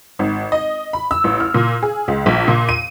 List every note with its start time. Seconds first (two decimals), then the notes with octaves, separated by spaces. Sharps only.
0.19 G#1
0.52 D#5
0.93 B5
1.11 E6
1.24 A1
1.40 F6
1.54 A#2
1.83 G#4
2.08 C#2
2.26 A#1
2.48 A#2
2.69 D#7